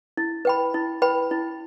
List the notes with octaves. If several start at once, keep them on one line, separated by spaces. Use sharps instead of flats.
E4
B4 G5 B5
E4
B4 G5 B5
E4